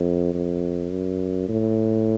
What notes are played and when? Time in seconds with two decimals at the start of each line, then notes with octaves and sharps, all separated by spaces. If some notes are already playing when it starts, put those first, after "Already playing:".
Already playing: F2
0.34 F2
0.91 F#2
1.49 A2